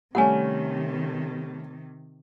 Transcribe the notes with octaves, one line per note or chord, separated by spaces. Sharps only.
C3 D#3 G3 A3 C#4 F#5 G#5